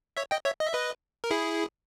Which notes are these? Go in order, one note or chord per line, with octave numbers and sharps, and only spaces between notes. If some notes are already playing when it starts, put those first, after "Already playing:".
C#5 E5
D#5 G5
C#5 E5
D#5
E5
B4 D#5
A#4
E4 G#4